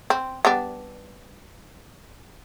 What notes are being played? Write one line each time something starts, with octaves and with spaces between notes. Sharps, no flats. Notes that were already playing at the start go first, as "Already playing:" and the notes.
C4
G3 B3 D4